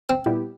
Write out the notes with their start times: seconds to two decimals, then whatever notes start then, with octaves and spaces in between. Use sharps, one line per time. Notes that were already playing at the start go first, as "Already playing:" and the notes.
0.09 C4
0.26 A#2 G3 B3 E4 G4